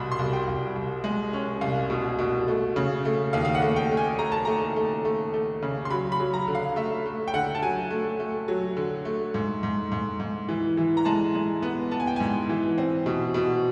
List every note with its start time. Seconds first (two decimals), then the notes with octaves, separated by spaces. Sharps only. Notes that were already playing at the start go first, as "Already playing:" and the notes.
Already playing: C2 B2 B5 C6
0.12 C6
0.19 C2
0.33 G5
0.47 C2
0.76 C2
1.04 G#3
1.33 C#4
1.61 C2 F5
1.90 B2
2.19 B2
2.48 A3
2.76 C#3
3.05 A3
3.33 D#2 F5
3.45 F5
3.55 F#5
3.62 A3
3.76 G5
3.91 A3
3.97 G#5
4.19 A3 A#5
4.32 A5
4.45 A3 A#5
4.76 A3
5.05 A3
5.34 A3
5.62 C#3
5.85 C6
5.90 F#3 B5
6.12 B5
6.20 F#3
6.34 A#5
6.48 D3
6.55 F5
6.76 A3 E5
7.06 A3
7.28 G5
7.34 D3 F#5
7.55 A5
7.62 F#3 G#5
7.90 A3
8.20 A3
8.48 F#3
8.77 D3
9.05 A3
9.34 G#2
9.63 G#2
9.92 G#2
10.20 G#2
10.49 E3
10.77 E3
10.97 A#5
11.05 G#3 A5
11.35 G#3
11.62 B3
11.91 B3 A5
12.00 G#5
12.07 G5
12.16 G#2 G#5
12.49 E3
12.78 C4
13.06 B2
13.34 B2